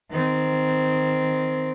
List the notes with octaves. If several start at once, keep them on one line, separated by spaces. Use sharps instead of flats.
D#3 C4